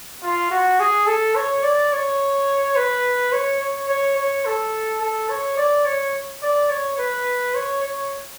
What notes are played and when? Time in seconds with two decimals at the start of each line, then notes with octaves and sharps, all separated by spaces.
0.23 F4
0.51 F#4
0.79 G#4
1.07 A4
1.35 C#5
1.63 D5
1.92 C#5
2.76 B4
3.33 C#5
3.61 C#5
3.89 C#5
4.17 C#5
4.46 A4
5.01 A4
5.29 C#5
5.57 D5
5.85 C#5
6.43 D5
6.70 C#5
6.98 B4
7.55 C#5
7.83 C#5